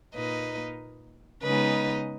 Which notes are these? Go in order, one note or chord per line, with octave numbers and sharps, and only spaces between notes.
A#2 A#3 D#4 B4 D#5
C#3 G#3 B3 D#4 B4 D#5